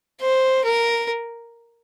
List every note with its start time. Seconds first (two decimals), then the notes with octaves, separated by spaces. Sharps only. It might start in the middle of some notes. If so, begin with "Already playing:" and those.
0.21 C5
0.64 A#4